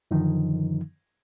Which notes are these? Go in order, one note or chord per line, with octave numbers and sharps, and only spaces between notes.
F#2 D3 D#3 F3 D#4